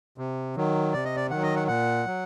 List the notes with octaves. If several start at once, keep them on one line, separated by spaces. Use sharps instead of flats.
C3
D#3 F#3
C3 D5
D#5
D5
D#3 F#3 F#5
D#5
F#5
A#2 F#5
F#3